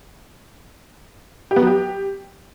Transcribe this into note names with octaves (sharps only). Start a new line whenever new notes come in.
G4
B3
F#3
G4